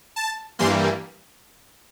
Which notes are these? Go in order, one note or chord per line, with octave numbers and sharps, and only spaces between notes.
A5
G2 E3 G3 A#3 C6